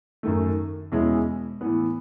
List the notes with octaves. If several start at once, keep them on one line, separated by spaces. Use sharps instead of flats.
F#2 D#3 A3
E2 B2 G#3 C#4 E4
A2 E3 B3